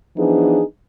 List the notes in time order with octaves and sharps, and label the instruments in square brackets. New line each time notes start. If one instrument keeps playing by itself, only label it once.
[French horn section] E3 F3 B3 D4 D#4 G#4